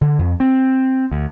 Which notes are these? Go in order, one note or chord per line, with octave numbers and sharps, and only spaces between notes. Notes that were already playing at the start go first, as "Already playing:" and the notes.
D3
F2
C4
D2